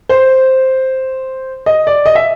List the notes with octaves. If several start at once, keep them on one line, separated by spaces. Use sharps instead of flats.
C5
D#5
D5
D#5
E5